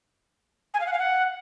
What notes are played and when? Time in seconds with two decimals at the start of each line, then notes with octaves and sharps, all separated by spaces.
0.74 G#5
0.80 F5
0.86 F#5
0.93 F5
0.99 F#5